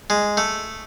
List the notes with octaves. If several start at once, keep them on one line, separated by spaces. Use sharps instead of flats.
G#3
A3